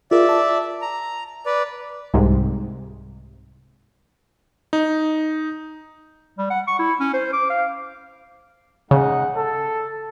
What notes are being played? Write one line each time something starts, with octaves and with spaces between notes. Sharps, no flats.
F4 G#4 A#4 D5 E5
A5
A#5
B4 D5
C2 G#2 C3
D#4
G3
F#5
C#6
E4
C#4
C5
D6
F5
C#3 G#3 D#4 F#5
A4